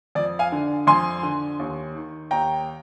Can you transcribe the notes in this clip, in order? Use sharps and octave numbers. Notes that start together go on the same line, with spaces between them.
F2 D5
F5 G#5
D3
F2 G#5 C6
D3
D#2
D#3
D#2 G5 A#5